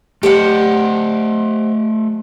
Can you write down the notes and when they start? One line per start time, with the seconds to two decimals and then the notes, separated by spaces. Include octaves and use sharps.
0.23 A3 G4 C5 D#5 F#5